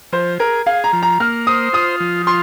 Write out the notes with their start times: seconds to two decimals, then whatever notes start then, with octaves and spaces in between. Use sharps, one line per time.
0.12 F3 C5
0.39 G#4 A#4
0.66 G#4 F5
0.84 A#5
0.93 F3
1.03 A#5
1.20 A#3 F6
1.47 C5 D#6
1.73 F4 D#6
2.00 F3
2.27 F4 C6